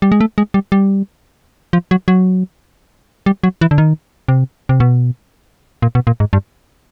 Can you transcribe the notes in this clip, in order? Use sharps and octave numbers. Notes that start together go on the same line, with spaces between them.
G3
G#3
A3
G#3
G3
G3
F3
F#3
F#3
G3
F#3
E3
D3
D#3
C3
C3
B2
A#2
B2
A#2
G#2
G2